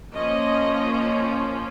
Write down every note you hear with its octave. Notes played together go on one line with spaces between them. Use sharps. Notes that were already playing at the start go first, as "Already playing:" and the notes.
F3 A#3 C#4 D#5